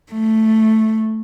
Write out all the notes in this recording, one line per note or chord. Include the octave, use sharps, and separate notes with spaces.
A3